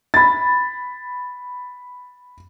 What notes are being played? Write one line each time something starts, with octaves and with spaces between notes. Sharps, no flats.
B5 A6